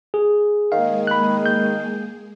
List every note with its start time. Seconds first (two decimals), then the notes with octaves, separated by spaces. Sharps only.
0.14 G#4
0.72 D#3 G#3 A#3 G#4 F5
1.07 B5 F#6
1.46 G6